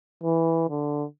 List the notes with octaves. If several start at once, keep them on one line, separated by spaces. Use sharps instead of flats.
E3
D3